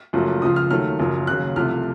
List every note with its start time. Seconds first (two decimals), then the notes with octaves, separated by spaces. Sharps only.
0.13 F#1 F#2 F3 A3
0.42 C#2 C#3 F3 D#6
0.56 F6
0.70 D#2 D#3 F#3 A3 F6
0.99 F#1 F#2 F3
1.27 D#2 C#3 F#3 F#6
1.56 C2 C3 F3 A3 F6